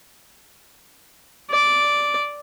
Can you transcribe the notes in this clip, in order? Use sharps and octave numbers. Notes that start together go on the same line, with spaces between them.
D5